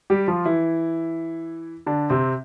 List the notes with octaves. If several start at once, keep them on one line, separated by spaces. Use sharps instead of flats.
G3 G4
F3 F4
E3 E4
D3 D4
C3 C4